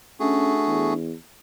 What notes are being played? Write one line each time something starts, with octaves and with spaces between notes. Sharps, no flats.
A3 C#4 D4 F#4 G#4
E2